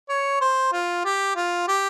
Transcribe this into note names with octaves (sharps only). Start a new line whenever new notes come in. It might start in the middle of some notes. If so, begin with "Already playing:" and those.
C#5
C5
F4
G4
F4
G4